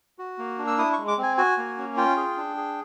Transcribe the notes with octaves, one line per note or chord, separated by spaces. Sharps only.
F#4
A#3
D4
E6
E4 D#6
G#3 C#6
D6
C4
G#5
F#4 G#5
A#3
C#4
F4 G5
G#4
D4
G#4